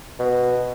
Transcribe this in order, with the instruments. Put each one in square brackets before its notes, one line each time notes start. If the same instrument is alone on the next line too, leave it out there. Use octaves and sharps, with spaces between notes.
[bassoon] B2